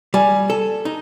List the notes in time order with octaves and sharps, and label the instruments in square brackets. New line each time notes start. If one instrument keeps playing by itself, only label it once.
[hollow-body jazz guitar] G3 [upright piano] G#5
[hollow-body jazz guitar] A4
D#4